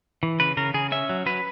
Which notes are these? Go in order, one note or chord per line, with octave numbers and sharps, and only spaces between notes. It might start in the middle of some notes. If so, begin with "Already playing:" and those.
E3
C#3 B4
C#3 A#4
C#3 G#4
C#4 E5
F#3
F#3 B4